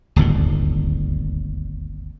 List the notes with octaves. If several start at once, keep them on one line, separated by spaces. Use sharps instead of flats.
D1 G1 D#2 A#2